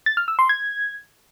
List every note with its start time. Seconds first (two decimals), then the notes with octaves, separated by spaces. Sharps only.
0.06 A6
0.17 F6
0.28 E6
0.39 C6
0.49 G#6